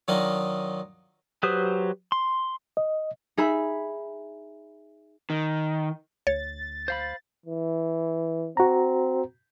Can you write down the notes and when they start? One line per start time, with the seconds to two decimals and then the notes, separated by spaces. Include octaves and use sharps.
0.08 D#3 F#3 D4 D#4 F4 D#5
1.43 F#3 G4 B4 C5 D#6
2.12 C6
2.77 D#5
3.37 D#4 G#4 E5 B5
5.30 D#3
6.27 D2 C#5 A6
6.88 C5 F5 B5
7.46 E3
8.57 C4 F#4 A#5